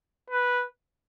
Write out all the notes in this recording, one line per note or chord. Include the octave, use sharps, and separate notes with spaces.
B4